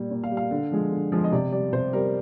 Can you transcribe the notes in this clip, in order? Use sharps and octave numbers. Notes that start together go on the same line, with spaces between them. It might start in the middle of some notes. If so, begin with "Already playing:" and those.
Already playing: A#2 G3
A#2
F5
G3
F5
D3
F3 G#3
D3
F3 G#3
D#5
C3 D5
G3 D5
C3 C5
G3 A#4